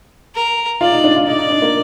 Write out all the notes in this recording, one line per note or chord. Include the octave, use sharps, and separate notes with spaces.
A#4
F4 D5
D#4
D4
F4
D#4 D5
D#4
D4
A#3